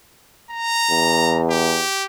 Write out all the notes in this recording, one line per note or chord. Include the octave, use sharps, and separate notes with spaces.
A#5
E2
G4